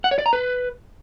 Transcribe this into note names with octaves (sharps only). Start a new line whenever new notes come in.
F#5
C#5
D5
A#5
B4